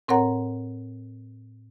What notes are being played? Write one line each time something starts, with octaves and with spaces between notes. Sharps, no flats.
A2 C4 A#4 C#5 F#5 A#5